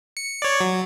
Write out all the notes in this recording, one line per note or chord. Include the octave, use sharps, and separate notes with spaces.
C#7
C#5 D5
F#3